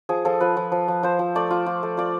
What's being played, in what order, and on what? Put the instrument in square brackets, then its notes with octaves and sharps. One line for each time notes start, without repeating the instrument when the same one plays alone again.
[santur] F3 G#4
F3 A4
F3 B4
F3
F3
F3
F3 C5
F3
A3 D5
F4
F4
A3
F4 D5